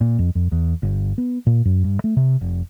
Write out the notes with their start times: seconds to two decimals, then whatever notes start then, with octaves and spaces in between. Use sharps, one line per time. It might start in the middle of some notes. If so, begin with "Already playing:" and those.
0.01 A#2
0.19 F2
0.35 F2
0.52 E2
0.83 G1
1.18 B3
1.46 A#2
1.65 F#2
1.84 G2
2.04 A3
2.17 C3
2.41 F1